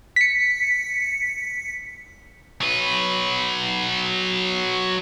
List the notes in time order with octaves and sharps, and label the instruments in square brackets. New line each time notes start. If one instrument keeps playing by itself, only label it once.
[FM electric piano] B6 C#7
[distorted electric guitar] F#3 B4